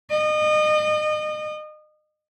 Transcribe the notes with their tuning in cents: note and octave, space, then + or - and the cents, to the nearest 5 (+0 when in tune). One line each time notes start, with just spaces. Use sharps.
D#5 -30